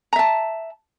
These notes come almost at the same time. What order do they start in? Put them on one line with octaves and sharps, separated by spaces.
A#5 E5 A5